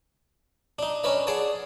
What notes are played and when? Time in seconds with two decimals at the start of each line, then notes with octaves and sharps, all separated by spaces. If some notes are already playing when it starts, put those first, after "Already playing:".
0.79 D4 D#4
1.04 C#4 D4 B4 D#5
1.27 G#4 D5 F#5 A5 D#6